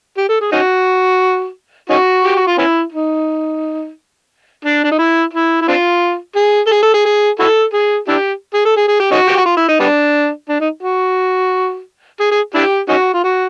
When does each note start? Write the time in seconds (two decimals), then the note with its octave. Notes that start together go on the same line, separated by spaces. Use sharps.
0.17 G4
0.29 A4
0.41 G#4
0.52 C#4 D#4 F#4
1.90 C#4 D#4 F#4
2.25 G4
2.36 F#4
2.47 F4
2.58 B3 C#4 E4
2.92 D#4
4.65 D4
4.84 D4
4.91 D#4
4.99 E4
5.34 E4
5.62 E4
5.68 C4 D4 F4
6.36 G#4
6.67 A4
6.71 G#4
6.83 A4
6.94 G#4
7.05 G#4
7.40 E4 F#4 A4
7.73 G#4
8.08 D4 E4 G4
8.54 G#4
8.65 A4
8.77 G#4
8.88 G#4
9.00 G4
9.11 C#4 D#4 F#4
9.27 G4
9.37 F#4
9.46 F4
9.57 E4
9.69 D#4
9.80 G3 B3 D4
10.49 D4
10.60 D#4
10.83 F#4
12.20 G#4
12.31 G#4
12.54 D4 E4 G4
12.89 C#4 D#4 F#4
13.14 F4
13.24 F#4